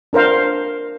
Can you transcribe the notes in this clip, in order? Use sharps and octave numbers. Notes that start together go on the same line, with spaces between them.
D4 A#4 C5 F5